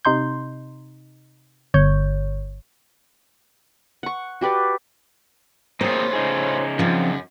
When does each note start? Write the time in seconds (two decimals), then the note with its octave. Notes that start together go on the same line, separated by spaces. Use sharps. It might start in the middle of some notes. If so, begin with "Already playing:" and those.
0.05 C3 D#4 C6 G6
1.74 G1 C#5 G6
4.03 F#5 C#6
4.41 F#4 G4 B4 D5
5.81 A2 A#3 C4 F4 G#4 C5 C#5
6.13 C#3 D#4 G#4
6.79 F#2 F3 C4